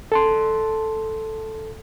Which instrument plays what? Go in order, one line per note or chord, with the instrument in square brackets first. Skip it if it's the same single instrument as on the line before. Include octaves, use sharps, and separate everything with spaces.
[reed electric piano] A4 A5 C6